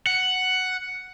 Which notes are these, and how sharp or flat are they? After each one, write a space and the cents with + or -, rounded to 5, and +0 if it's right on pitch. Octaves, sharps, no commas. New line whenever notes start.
F#5 +5